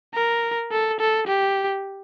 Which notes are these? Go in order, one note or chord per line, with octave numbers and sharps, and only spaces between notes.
A#4
A4
A4
G4